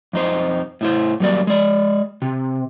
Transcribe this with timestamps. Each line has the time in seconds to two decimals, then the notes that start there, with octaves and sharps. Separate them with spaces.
0.13 F2 D#4 C5
0.81 A2 E4 C5
1.20 F#2 G3 A#3 D5
1.47 G#3 D5
2.22 C3